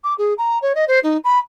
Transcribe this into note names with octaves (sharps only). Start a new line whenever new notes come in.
D6
G#4
A#5
C#5
D#5
C5
D#4
B5